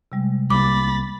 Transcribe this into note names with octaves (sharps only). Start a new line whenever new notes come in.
C3 G3 G#3
C2 A#3 B5 D6 A6